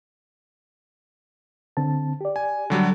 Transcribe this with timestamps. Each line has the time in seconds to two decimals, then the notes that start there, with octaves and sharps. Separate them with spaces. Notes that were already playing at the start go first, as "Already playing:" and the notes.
1.77 D3 C4 A5
2.21 G4 D5
2.36 G#5
2.70 D3 F#3 G3